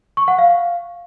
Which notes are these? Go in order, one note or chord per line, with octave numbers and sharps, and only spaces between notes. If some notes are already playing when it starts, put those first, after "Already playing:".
C#6
F#5
F5